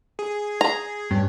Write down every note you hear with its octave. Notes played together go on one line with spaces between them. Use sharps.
G#4
A#5
G2 C#4